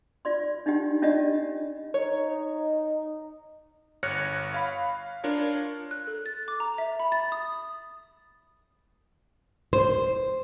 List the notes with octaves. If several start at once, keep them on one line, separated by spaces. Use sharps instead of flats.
F4 D5 C6
D4 D#4 F4 G4 G5
C#4 D4 F4 G4 D5 D#5
D#4 C#5
G1 C#5 F6 F#6 A#6 C#7
F5 B5
D4 F4 A#4 C#5
F#6
A4
A6
D6
A#5
E5
B5
A6
D#6
C5